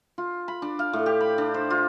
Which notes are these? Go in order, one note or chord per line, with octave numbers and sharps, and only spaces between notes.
F4
B5
D4
F5
A2
G4
B5
D4
C5
F4